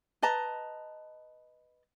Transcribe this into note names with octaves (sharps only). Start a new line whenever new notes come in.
B4 D#5 A5 A#5